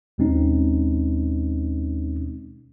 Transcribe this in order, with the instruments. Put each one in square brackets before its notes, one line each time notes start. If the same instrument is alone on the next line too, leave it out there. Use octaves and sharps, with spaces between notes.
[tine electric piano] D#2 B2 G#3 C4 C#4 D#4